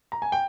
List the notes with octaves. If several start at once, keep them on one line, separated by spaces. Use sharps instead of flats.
A#5
G#5
G5